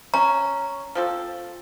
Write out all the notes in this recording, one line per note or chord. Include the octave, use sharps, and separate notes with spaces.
C#4 A#5
F3 C4 A4